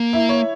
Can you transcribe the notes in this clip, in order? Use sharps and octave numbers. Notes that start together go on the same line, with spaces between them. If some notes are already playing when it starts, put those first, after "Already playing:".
Already playing: A#3
E4
C#5